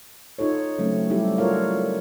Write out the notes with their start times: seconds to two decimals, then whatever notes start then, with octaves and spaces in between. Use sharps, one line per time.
0.39 D#4 F4 A4 C#5
0.78 C#3 F#3 A3 C4 C#4
1.10 G3 D4 E4 G4 A4
1.38 F4 F#4 A4 A#4 C#5 F5